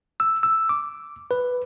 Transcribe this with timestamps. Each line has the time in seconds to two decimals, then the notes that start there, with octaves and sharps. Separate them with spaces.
0.20 E6
0.43 E6
0.69 D6
1.31 B4